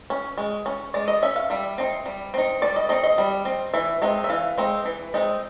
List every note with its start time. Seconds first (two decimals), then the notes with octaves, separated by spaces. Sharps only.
0.10 C#4
0.38 G#3
0.66 C#4
0.94 G#3 D5
1.08 D#5
1.22 C#4 E5
1.36 F5
1.50 G3 E5
1.78 C4 D#4
2.06 G3
2.34 C4 D#4
2.62 G3 D5
2.76 D#5
2.89 C4 D#4 D#5
3.03 D#5
3.18 G3
3.45 C4 D#4
3.74 E3 E5
4.02 G#3 C4 D#4
4.24 E5
4.29 E3 F5
4.58 G#3 C4 D#4
4.85 E3
5.14 G#3 C4 D#4